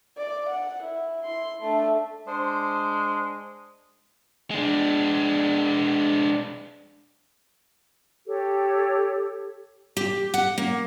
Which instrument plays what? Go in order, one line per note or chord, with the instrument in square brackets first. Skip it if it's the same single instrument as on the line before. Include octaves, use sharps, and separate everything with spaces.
[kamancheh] D5
F#5
E4
E4 C6
A3 D4
[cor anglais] G#3 [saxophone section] D4 C5
[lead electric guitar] G#3 D4
[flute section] G4 A4 C#5
[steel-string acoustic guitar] G4
F#5
A#3